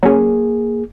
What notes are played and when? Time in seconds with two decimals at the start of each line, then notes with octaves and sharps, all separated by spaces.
0.03 F#3 A#3 C#4 G#4